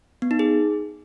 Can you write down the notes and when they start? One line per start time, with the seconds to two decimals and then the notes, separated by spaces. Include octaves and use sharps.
0.22 B3
0.31 D#4
0.39 G#4